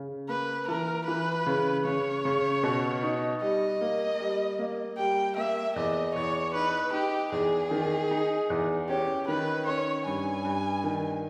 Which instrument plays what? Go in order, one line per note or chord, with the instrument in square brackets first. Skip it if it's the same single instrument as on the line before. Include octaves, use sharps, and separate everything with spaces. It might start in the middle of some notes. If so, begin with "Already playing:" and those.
Already playing: [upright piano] C#3
[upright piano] A#3 [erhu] B4
[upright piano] E3 [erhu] A#4
[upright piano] E3 [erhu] B4
[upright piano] C#3
[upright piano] C#3 [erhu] C#5
[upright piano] C#3
B2
D#4
[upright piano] G3 [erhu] D#5
[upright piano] A#3
G3
A#3
[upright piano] G3 [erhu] G5
[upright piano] A#3 [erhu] E5
[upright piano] E2 [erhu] D#5
[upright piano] E2 [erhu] C#5
[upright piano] D#4 [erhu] B4
[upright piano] D#4 [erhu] G4
[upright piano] E2 [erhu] G#4
[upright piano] D#3
D#4
E2
[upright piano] C#4 [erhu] G4
[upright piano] D#3 [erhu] B4
[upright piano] C#4 [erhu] C#5
[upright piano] G2 [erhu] G#5
[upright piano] G2
D#3